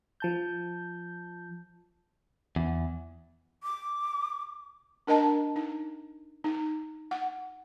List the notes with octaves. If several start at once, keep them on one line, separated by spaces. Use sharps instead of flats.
F3 A5 G6
E2
D6
D4 A#4 D#5 A5 A#5
D#4
D#4
F#5